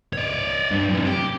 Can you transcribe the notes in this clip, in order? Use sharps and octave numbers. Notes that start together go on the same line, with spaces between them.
C#5 D5
G2
F#2 C3
G4